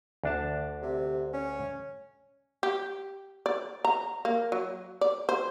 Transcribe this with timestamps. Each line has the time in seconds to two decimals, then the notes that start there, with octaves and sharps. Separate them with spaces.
0.24 D2 D4 A5
0.82 C3
1.33 C#4
2.63 G4
3.46 D5
3.85 A#5
4.25 A#3
4.52 F#3
5.01 D5
5.29 C5